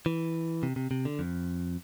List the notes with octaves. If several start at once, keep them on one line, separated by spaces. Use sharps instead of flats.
E3
C3
C3
C3
D3
F2